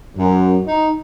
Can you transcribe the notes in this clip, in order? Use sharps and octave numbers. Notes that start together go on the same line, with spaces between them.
F#2
D#4